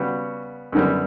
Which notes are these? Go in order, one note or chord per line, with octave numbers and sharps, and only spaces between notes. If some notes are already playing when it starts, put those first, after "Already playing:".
Already playing: C#3 G3 B3 F#4
F#2 D3 G3 B3